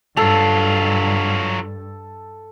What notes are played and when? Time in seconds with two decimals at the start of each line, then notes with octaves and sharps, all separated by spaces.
0.17 G2 F#3 F4 A4